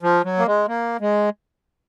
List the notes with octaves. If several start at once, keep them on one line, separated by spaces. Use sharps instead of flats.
F3
F#3
A#3
G#3
A#3
G#3